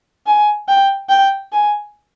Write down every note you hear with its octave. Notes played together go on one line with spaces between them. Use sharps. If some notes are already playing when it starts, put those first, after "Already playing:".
G#5
G5
G5
G#5